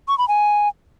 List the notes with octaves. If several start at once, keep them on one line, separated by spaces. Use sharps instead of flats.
C#6
B5
G#5